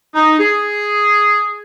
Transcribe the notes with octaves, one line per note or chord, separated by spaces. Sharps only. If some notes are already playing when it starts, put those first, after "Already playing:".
D#4
G#4